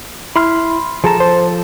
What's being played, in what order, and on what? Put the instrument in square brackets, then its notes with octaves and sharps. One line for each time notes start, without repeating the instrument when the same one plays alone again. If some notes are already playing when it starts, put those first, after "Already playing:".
[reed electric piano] E4 [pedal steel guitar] B5 C6 F6
[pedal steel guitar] F3 A4 A5 [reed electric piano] G#4 A#5
[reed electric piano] C5